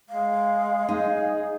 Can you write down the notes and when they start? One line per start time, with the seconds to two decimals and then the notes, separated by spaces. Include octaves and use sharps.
0.09 G#3 F5
0.89 D#4 G#4